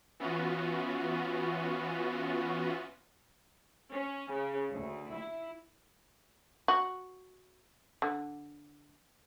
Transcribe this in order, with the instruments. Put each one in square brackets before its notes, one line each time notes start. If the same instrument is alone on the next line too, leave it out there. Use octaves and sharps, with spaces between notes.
[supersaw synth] E3 B3 C#4 F4 F#4
[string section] C#4
C#3
D2
E4
[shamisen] F#4
D3